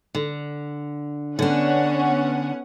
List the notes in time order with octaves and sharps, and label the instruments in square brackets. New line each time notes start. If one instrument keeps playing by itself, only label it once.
[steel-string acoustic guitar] D3
[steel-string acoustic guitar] D3 D4 [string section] B3 C#4 F#5